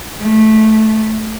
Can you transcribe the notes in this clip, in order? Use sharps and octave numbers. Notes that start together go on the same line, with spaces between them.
A3